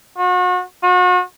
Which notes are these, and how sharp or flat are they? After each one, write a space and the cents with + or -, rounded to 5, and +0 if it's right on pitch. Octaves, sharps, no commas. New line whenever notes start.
F#4 -35
F#4 -40